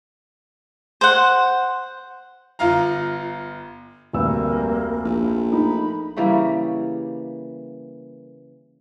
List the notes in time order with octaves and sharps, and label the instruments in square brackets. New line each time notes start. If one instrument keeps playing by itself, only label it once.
[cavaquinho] C5 F#5
[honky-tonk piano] G1 F4 F5 A#5
[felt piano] F1 D2 E6 [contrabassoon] G2 [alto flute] A#3
[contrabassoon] A#1
[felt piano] A3 D#4 [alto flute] B5
[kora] C#3 E3 G3 A#3